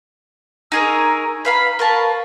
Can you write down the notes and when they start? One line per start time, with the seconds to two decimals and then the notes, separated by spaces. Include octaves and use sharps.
0.72 D#4 G#4 A#4 A#5 C#6 E6
1.45 B4 F5 A#5 B5
1.79 A#4 B4 F5 A5 C#6